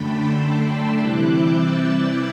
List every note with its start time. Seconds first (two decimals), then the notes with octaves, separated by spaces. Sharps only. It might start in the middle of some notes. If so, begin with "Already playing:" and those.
Already playing: F#2 D3 A3 D4 G5 B5
0.10 A5 C6
0.40 B5 D6
0.69 C6 E6
0.98 C3 E3 G3 C4 E4 D6 F#6
1.28 E6 G6
1.57 F#6 A6
1.86 E6 G6